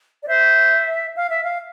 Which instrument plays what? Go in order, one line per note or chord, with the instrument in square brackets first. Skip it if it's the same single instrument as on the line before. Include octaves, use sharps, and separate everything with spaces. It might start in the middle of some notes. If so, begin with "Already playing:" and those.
[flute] D5
[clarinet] C5 [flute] E5
[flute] F5
E5
F5